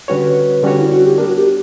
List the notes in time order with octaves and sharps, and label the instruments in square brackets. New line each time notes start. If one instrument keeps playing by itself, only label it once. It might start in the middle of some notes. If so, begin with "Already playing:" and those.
[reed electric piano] D3 G3 C#4 F#4 C#5 [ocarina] B4
[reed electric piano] D3 G3 C#4 F#4 C#5 [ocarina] D4
[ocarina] E4
F#4
G4
[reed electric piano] G3 B3 D4 [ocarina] A#4
[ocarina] F#4
G4